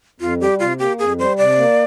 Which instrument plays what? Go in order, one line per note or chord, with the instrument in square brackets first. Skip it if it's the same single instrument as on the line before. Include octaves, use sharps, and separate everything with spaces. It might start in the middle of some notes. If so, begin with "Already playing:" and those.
[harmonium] F2 [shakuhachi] F4
[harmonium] G3 [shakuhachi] G4
[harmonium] C3 [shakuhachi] F4
[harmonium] A#3 [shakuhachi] G4
[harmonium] F2 [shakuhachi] G#4
[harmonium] G3 [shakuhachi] C5
[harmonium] C3 [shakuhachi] D5
[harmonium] A#3